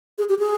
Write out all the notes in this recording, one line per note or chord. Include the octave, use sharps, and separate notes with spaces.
G#4
G4
G#4